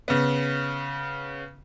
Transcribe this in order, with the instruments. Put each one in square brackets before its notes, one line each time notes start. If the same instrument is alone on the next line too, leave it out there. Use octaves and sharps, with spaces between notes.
[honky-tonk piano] C#3 B3